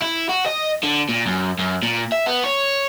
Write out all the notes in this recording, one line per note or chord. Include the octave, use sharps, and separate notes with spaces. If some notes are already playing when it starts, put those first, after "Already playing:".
E4
F#4
D#5
D3
A#2
F#2
F#2
A#2
E5
B3
C#5